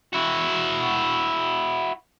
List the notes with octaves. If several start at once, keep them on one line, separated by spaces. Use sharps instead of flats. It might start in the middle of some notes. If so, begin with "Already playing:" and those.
E4 F#4